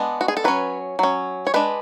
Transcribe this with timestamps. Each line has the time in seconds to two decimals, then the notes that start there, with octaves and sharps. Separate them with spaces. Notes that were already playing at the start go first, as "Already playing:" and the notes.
Already playing: G#3 B3 D4
0.21 F#4
0.28 G#4
0.37 A4
0.44 F#3 C#4 B4
0.99 F#3 C#4
1.47 C#5
1.54 G#3 D4 B4